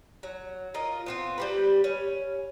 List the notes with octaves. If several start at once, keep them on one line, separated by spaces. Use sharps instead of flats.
F#3
F4 A#4 D#5
B3 C4 F4
G3 G4 B4
C#4